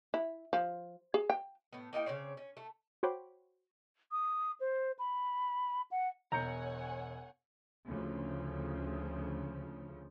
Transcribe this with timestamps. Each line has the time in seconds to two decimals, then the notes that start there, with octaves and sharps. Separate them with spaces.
0.14 E4
0.53 F3
1.14 G#4
1.30 G5
1.73 A2 B3
1.93 A#3 D#4 E4 G4
2.06 C#3 C4 C#5 D5
2.37 C#4
2.57 A3
3.03 F#4 C5 C#5 G5 B5 D6
4.12 D#6
4.60 C5
4.99 B5
5.91 F#5
6.32 E1 C#5 F#5 G#5 A#5 G6 C#7
7.88 D2 C#3 F3